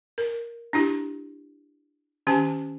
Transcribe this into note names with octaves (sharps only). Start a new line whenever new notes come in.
A#4
D4 E4 G4
D#3 C#4 G4 G#5 A5